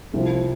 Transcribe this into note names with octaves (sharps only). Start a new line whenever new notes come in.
C2 F3